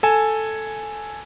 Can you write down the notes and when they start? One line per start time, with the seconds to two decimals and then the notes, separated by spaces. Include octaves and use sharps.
0.03 A4 G#5 E7